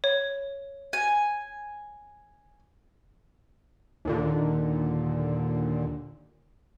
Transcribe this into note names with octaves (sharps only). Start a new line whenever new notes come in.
C#5
G#5
D#2 A#2 D3